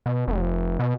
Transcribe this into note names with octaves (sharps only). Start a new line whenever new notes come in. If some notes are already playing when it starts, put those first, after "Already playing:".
B2
F1
B2